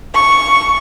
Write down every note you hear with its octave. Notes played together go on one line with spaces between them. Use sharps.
C#6